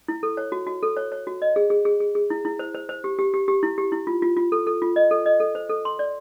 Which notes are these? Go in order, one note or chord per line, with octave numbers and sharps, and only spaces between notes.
E4
A4
C#5
F#4
F#4
A4
C#5
C#5
F#4
D#5
G#4
G#4
G#4
G#4
G#4
E4
E4
C5
C5
C5
G4
G4
G4
G4
E4
G4
E4
F4
F4
F4
A4
A4
F4
D#5
A4
D#5
A4
C5
A4
C6
D5